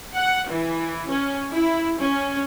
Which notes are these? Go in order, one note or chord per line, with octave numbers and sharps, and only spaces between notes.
F#5
E3
C#4
E4
C#4